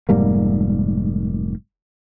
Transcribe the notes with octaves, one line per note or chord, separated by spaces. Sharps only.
F1 G#2 G3 A#3